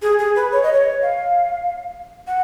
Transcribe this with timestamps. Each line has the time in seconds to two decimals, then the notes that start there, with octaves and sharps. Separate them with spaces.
0.02 G#4
0.19 G#4
0.36 B4
0.52 C#5
0.63 D#5
0.73 C#5
1.02 F5
2.27 F#5